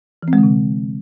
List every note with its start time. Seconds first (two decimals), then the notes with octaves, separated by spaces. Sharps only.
0.23 E3
0.28 C4
0.33 G#3
0.38 D3
0.43 C3